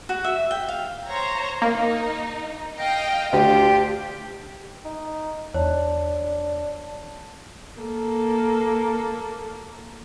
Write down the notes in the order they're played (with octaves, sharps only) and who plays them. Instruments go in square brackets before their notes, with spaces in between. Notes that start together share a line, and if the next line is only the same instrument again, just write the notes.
[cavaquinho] F#4
E5
G5
F5
[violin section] C5 C#5 A#5
[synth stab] A#3 [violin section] D#4
[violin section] D#5 F5 G5
[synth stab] D2 [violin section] D4 F4 [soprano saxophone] G4
[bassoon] D#4
[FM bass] E2 [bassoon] D4 [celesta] C#5 [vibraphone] A5
[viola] A#3 A4